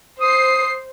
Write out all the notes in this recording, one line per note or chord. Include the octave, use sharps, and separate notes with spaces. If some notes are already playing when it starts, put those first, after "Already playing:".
C5 D#6 C7